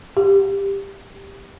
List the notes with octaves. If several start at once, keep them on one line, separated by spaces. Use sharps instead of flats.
G4